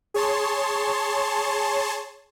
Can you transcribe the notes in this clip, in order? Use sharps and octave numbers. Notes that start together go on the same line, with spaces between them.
G#4 C#5 A5 C6